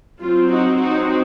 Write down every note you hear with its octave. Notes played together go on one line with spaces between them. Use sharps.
F#3 C4 F4
D#4 F#4
D#4 F#4